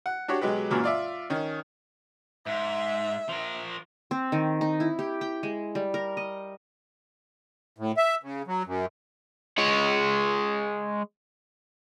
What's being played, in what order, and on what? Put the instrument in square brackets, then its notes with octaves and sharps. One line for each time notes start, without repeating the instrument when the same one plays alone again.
[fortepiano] F#5
D4 F#4 G4 C#5
B2 F#3 G#3 G4 B4
F#2 A#2 E3 F#3
F4 D5 E5
D#3 C#4
[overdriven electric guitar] G#2 [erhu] E5
[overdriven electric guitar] F3 A#4
[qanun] C4
D#3
D#4
E4
G4
G5
G#3
G3
A#4
D#5
[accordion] A2
E5
C#3
F#3
F#2
[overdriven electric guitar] G#3 C#5